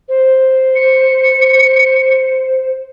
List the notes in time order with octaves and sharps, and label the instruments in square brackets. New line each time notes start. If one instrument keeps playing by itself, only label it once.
[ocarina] C5
[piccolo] C#7